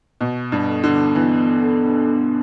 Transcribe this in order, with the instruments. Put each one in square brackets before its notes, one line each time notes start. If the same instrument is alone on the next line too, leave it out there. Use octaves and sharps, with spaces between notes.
[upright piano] B2 [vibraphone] B3
[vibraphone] B3
[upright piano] G2
[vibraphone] A4
[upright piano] D3
[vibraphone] D4
[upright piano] E3 [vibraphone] B3
[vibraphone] B3
A4
D4
B3